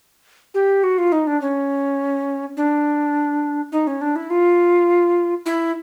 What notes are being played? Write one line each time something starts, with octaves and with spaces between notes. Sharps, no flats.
G4
F#4
F4
D#4
D4
C#4
D4
D#4
C#4
D4
E4
F4
E4